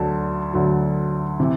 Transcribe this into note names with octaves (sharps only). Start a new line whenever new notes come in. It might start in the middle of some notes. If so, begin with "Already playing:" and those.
Already playing: D2 D3 F#3 A5
D2 D3 F#3
C3 E3